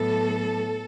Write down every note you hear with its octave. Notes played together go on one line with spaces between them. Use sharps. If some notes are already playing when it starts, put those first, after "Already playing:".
Already playing: A2 F#3 B3 A4